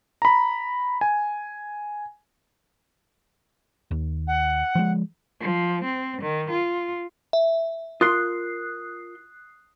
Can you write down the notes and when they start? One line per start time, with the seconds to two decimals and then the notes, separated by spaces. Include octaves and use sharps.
0.22 A#5 B5
1.01 G#5
3.91 D#2
4.27 F#5
4.75 F3 F#3 G#3
5.41 F3
5.84 C4
6.22 D#3
6.51 F4
7.33 E5
8.01 F4 A#4 C6 D#6 F#6 C7